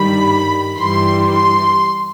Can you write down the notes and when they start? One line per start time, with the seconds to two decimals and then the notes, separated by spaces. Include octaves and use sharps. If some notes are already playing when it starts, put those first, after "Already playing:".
Already playing: G2 D#3 G3 B5
0.77 G2 E3 G3 C6
1.30 C6